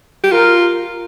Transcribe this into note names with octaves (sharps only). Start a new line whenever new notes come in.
G4
F4 A#4